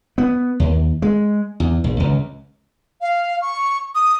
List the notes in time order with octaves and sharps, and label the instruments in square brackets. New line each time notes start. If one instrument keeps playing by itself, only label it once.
[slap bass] B3
D#2
G#3
E2
A#1
C#2
[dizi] F5
C#6
D#6